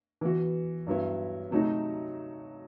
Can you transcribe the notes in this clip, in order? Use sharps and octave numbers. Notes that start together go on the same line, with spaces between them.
E3 B3 F#4
G2 F#3 B3 E4
C3 F#3 A3 D#4 F#4